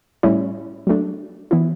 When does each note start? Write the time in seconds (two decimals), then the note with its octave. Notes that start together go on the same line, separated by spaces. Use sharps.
0.23 A2 G3 C#4 E4
0.87 F#3 A3 D4
1.51 E3 B3 E4